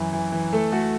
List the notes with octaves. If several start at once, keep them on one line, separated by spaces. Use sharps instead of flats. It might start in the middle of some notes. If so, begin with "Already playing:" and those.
Already playing: F#2 E3 E4
E3
E3
A3 A4
A3 F#4